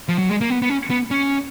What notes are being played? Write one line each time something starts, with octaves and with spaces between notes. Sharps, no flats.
F3
F#3
G#3
A#3
B3
B3
C#4
B3
C#4